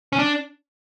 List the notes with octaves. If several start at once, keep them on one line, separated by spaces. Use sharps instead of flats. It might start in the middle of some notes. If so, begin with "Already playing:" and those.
C#4
D4